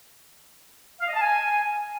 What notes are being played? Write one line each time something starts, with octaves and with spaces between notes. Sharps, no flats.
F5
D#5
A5
G#5